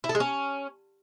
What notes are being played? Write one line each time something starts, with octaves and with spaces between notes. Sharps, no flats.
E4
A4
G#3
C#4